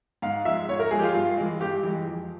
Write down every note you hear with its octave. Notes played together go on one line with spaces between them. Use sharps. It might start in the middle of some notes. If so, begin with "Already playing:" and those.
G#2 F5
F3 G#3 E5
G#2 C#5
A#4
F3 G#3 G#4
G4
F4
G2 F4
E3 G#3
G2 G4
E3 G#3
F2